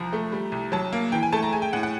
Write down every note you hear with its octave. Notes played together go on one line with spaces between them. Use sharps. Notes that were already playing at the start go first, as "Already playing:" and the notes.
Already playing: C2 F3 A#5
A3
G3
C2
F#3 A5
A#3
E3 G5
G#5
A3 A5
A#5
G#3 G#5
G5
A2 F#5
F#5